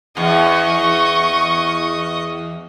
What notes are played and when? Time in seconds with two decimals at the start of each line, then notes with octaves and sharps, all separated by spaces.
0.17 E2 D#5 C#6